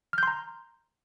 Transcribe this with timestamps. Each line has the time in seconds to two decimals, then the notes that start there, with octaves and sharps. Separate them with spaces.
0.13 F6
0.18 G6
0.23 C6
0.27 A#5